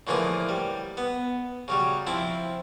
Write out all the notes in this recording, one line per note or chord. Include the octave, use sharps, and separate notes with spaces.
A2 D3 E3 F3 A#3 G#4
G3
B3
C#3 F#3 G3
F3 C4 E4